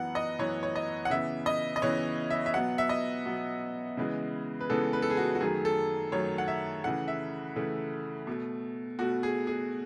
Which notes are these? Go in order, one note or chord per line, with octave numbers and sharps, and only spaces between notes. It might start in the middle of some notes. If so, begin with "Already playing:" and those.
Already playing: F#2 E3 B3 F#5
D#5
F#2 E3 B3 C#5
C#5
D#5
F#5
C#3 E3 B3 E5
D#5
D#5
C#3 E3 B3 C#5
E5
E5
B2 F#3 B3 F#5
E5
D#5
B2 F#3 B3
C#3 E3 G#3 B3
B4
C#3 E3 G#3 B3 A4
B4
A4
G#4
F#4
F#4
F#2 D#3 F#3 A3 G#4
A4
F#2 D#3 F#3 A3 C#5
F#5
E5
C#3 E3 A3 F#5
E5
C#3 E3 A3
B2 A3
B2 A3 F#4
G#4
G#4